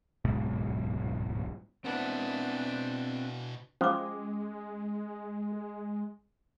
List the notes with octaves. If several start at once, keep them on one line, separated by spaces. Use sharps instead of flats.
D1 B1 G#2 B2
B2 C4 D4 E4 B4 F#5
F3 G#3 C#4 D6